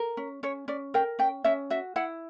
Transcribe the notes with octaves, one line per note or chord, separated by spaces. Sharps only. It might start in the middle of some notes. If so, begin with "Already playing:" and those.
Already playing: A#4
C#4
C#4 C#5
C#4 D5
A#4 G5
C#4 G5
C#4 E5
F#4 E5
E4 F#5